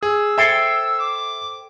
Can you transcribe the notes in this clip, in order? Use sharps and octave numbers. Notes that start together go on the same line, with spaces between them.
G#4 E6
A4 C5 E5 G5 G#6
D6